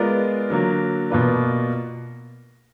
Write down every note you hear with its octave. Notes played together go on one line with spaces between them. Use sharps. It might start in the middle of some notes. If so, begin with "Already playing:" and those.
Already playing: G#3 B3 F4 A#4 D5
D3 F#3 A#3
B2 A#3 F4 B4 D5